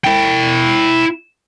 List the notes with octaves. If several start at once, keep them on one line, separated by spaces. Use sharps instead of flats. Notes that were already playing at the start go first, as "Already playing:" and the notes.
E4 G5